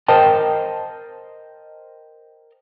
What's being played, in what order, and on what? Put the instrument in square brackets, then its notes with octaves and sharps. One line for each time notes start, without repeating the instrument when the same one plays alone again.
[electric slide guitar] A#4 C5 D#5 G5 A5